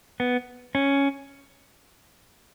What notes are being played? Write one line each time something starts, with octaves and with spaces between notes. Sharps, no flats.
B3
C#4